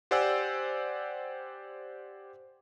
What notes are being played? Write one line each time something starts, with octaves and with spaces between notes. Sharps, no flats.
G4 C5 D5 F#5 G#5 E6